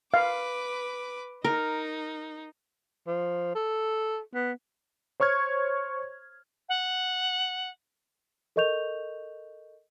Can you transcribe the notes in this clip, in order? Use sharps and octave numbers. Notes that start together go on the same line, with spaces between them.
B4 F5 D6
D#4 A#4
F3
A4
B3
C5 C#5 C#6 F6 G#6
F#5
A4 A#4 D#5 C#6 G6 F7